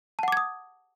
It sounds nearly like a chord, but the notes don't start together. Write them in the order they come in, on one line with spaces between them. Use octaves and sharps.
A5 F#5 D6 G#6 D#6